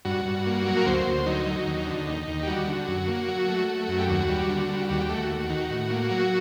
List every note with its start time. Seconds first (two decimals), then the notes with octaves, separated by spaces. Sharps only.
0.05 G2 F#4
0.25 G2
0.46 A#3
0.66 F#3
0.77 A#4
0.86 D2 C5
1.06 D2
1.26 F#3 D#4
1.46 F#3
1.66 D#2
1.86 D3
2.07 D#2
2.27 D#2
2.43 G4
2.47 G3 F#4
2.68 D3
2.87 F#2
3.08 A#3
3.28 F#3
3.48 A3
3.68 A3
3.88 F#2
3.99 G4
4.09 D#2 F#4
4.29 G3
4.49 D3
4.69 G3
4.89 D#2 F#4
5.01 G4
5.09 A3 F#4
5.30 D#2
5.50 D#3
5.70 A2
5.90 A#3
6.11 F#3